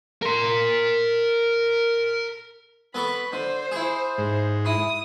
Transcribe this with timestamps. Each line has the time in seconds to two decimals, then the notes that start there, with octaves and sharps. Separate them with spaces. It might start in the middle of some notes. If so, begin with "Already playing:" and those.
0.22 A#4 C6
2.95 B3 A4 B5 C#6
3.33 D3 C5
3.72 E4 G#4
4.18 G#2
4.66 E4 D#6